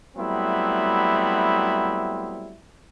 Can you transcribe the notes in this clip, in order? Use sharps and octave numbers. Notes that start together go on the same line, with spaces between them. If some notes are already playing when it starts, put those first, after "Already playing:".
F#3 G3 A3 B3 C4 E4